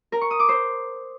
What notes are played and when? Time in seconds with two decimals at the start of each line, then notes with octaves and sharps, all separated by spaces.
0.12 A#4
0.21 C#6
0.30 D#6
0.40 D6
0.49 C5